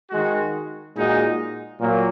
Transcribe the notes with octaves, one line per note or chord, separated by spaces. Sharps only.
D#3 G#3 F#4
A#2 G#3 D#4 F#4
A#2 F#3 A#3